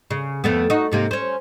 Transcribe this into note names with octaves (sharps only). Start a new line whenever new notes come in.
C#3
F2 A3 B3
D#4 F#4
G#2 C3 A#3
C#4 C5